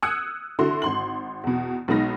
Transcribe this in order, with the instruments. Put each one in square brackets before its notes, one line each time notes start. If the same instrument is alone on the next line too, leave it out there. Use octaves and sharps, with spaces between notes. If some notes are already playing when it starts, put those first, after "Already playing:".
[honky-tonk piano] D#6 E6 F#6 G#6 C#7
D3 E4 F#4 C6
G#1 C6 F#7
E2 B2
B1 G#3 B3 D#4 A#6